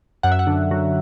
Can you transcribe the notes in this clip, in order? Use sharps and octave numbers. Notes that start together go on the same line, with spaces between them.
F#2 F#5
E5
F#5
D3
F#3